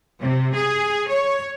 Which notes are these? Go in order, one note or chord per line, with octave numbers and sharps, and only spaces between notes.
C3
G#4
C#5